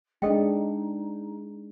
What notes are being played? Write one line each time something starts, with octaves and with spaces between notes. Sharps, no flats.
G#3 D4 D#4 A4 D#5 G5